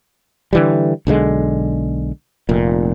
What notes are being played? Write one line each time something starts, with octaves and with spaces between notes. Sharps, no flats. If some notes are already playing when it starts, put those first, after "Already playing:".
D3 E3 G3
B1 D3 D#3 G#3
F1 A#2